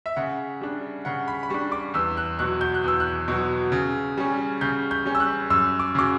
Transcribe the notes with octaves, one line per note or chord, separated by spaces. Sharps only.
E5
C#3 F#5
G3 D4
C#3 F#5
B5
B5
G3 D4 C#6
D6
E2 E6
F#6
B2 F#3 F#6
G6
F#6
E2 E6
F#6
B2 F#3
C#3
G3 C#4
C#3 G6
G6
G3 C#4
E6
F#6
F#2 E6
D6
C#3 F#3 D6